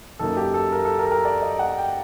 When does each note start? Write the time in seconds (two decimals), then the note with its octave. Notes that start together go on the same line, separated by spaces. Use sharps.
0.19 F#2 F#3 A#3 D#4 A4
0.37 G4
0.54 A4
0.72 A#4
0.85 A4
0.99 A#4
1.06 A4
1.12 A#4
1.25 D5
1.42 D#5
1.59 F#5
1.77 G5